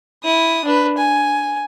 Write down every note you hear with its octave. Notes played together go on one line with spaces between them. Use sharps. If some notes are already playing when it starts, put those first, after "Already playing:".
E4 D#6
D4 B4
G#5